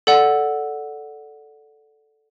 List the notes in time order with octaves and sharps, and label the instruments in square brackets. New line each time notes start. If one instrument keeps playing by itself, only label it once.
[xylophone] A4 D5 F#5